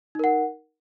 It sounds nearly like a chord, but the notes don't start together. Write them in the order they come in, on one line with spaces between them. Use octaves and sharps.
D#4 A#4 F#5